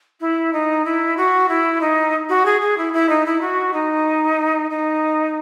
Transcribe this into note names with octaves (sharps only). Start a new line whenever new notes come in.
E4
D#4
E4
F#4
E4
D#4
F#4
G#4
G#4
E4
E4
D#4
E4
F#4
D#4
D#4